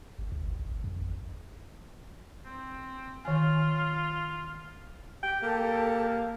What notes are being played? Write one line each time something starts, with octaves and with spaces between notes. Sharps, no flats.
G1
C#2
G1
G#1
F#1
F2
G#1
C4
D#3 F4 G#5
G4 G5
A#3 G4 A4 A5